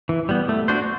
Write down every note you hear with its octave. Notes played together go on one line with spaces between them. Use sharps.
E3
G3 B3
A3
D4 F#4 C5